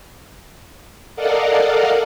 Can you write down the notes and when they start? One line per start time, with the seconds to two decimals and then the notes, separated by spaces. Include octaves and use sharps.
1.16 A4 A#4 D5 D#5 F5 F#5